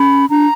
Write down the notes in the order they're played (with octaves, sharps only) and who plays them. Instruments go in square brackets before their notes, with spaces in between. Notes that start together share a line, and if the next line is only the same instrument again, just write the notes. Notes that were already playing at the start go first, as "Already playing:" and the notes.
Already playing: [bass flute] C#4 [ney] B5
[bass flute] D4 [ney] A#5